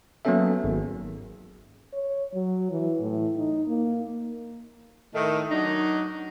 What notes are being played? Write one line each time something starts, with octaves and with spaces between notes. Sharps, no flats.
F#3 A#3 B3 C#4 A4 E5
G#1
C#5
F#3
E3
A2
D#4
A#3
A2 D#3 A3
F#3 D4 D#4